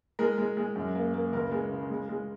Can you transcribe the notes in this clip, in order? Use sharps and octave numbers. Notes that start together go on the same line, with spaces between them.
G#3 A#4
G#3
G#3
F#2
A#3
A#3
C#2 A#4
G#3
C#3
G#3
G#3